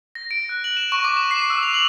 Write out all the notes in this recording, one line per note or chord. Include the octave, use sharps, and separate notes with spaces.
A#6
D7
F#6
F#7
E7
C#6
D6
E7
C7
E6
F7
F#7